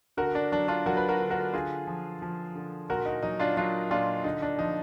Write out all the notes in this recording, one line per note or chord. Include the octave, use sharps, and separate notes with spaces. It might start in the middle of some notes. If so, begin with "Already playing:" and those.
D3 F#4 A#4
D4
F#3 D4
D4 F4
F#3 F#4 A#4
B4
F#4 A#4
D3
F#4 A#4
D3 F4 G#4
F3
F3
D3
A#2 F#4 A#4
D#4 F#4
F#3 D#4
D4 F4
F#3 D4 F4
A#2 D4 F4
D3 D#4
D4
F3 D#4